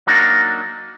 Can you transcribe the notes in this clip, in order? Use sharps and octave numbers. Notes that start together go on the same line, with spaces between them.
F#3 A#3 D4 D#4 F#4